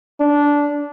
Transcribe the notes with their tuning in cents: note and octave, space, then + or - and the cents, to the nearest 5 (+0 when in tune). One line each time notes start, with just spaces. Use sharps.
D4 -15